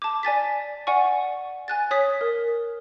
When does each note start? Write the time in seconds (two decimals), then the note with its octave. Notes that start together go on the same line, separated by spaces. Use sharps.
0.02 A5 D6
0.23 D5 G#5 A6 B6
0.87 D5 F#5 G#5 C#6
1.68 G#5 F#6 A6
1.91 C#5 D#6 B6
2.21 A#4